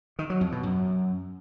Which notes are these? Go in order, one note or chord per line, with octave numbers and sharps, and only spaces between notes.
D#3
F#3
F2
B2
F#2